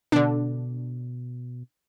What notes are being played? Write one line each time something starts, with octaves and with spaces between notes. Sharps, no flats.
B2 D3 D4